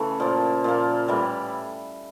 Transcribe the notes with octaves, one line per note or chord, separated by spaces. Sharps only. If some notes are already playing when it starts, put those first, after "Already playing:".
Already playing: C#3 E3 A3
A#2 F3 A#3
A#2 F3 A#3
A2 E3 G3